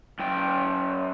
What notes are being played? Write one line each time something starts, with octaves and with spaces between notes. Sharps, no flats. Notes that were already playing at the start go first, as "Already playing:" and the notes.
F#2 G5